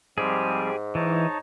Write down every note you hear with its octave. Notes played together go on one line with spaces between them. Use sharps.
G#2 F3 G3 C4 G4 G#4
E3 D#4 C#5 A5